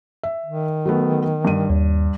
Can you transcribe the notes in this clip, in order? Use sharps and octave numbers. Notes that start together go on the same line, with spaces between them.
E5
D#3
F#3 A3 B3
G2 D#7
D#2